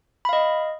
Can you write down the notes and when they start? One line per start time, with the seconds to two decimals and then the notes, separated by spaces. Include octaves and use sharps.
0.25 B5
0.29 F5
0.33 D#5